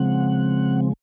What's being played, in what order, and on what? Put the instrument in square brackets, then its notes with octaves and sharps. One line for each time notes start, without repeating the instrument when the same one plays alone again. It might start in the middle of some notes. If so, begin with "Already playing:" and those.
Already playing: [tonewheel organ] C#3 F3 G#3 C4 F#5